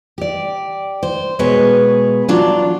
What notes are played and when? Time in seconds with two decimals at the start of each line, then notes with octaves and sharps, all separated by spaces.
0.18 G4 D5
1.03 C5
1.39 B2 G#3 G#4 B4 C#5
2.29 F#3 D4 F4